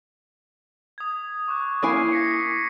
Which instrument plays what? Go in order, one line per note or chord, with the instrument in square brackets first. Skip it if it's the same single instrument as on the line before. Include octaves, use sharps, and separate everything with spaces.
[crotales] D#6 G#6
C#6 D6 F#6
[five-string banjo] A#3 E4 G#5 [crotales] G#6 C7 D#7
[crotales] A#6 B6 C#7